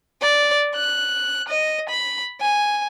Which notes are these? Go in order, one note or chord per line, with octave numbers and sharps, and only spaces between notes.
D5
F#6
D#5
B5
G#5